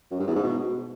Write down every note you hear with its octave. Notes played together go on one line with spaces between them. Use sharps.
F#2
G2
E2
G#2
B2